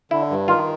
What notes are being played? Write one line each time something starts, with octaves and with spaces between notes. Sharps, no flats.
D3 E4
G2
D#3 F4